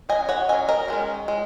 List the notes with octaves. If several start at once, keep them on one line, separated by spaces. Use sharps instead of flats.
F#3 C#4 D#5 G#5
C#5 F#5
F#3 C#4 D#5 G#5
A#4 D#5
D#3 G#3 C#4
G#3